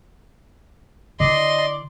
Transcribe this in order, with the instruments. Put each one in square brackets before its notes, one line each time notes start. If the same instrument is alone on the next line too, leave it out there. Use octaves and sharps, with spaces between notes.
[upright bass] D3 E4 [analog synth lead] D5 [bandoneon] D#5 [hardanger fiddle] C6